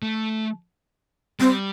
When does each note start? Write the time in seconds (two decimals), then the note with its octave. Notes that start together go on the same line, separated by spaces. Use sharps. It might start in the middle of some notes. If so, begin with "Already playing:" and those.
0.02 A3
1.40 G3 C4